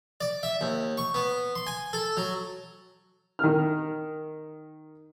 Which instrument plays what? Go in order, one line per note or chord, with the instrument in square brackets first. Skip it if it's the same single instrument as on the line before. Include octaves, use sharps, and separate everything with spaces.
[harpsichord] D5
E5
D#2
C#6
B3
C6
G#5
A4
F#3
[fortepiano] D#3 F6